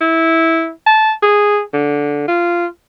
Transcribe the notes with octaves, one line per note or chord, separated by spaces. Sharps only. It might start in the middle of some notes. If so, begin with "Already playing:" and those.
E4
A5
G#4
D3
F4